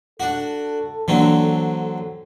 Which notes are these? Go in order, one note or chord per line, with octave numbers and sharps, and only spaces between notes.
D4 F#4 A4
D3 E3 F#3 A#3 C4 D4